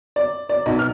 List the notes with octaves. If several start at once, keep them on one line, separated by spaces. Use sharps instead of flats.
D5
D5
B1
F6